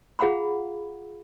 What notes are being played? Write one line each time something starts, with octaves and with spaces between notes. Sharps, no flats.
F4 G#4 F5 F#5 A#5 B5